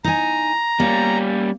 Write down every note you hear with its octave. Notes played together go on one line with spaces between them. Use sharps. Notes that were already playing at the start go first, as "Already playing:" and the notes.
D#4 G#5 A#5
G3 A#3 C#4